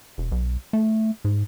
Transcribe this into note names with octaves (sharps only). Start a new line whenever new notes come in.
E1
B1
A3
G#2